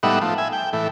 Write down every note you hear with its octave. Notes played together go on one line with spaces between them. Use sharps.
A2 G3 B3 D#4 E5 F#5
F3 A3
E5 G#5
G5
A2 E3